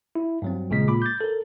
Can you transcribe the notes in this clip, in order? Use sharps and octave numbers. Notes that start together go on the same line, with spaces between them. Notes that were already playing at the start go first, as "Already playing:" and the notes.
E4
G2 F#3 C4
A#1 A#2 C#3 G#3 B6
A#2 B5 D6
G6 A6
A4 A#4